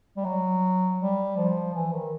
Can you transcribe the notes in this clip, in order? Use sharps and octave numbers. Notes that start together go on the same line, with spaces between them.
G3
F#3
G3
F3
E3
D#3